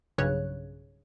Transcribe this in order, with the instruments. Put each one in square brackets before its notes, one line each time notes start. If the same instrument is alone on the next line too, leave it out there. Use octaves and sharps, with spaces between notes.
[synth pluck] B1 G2 C#3 C#5 F#6